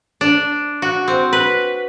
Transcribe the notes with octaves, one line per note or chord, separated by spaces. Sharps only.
D4
F#4
C4
B4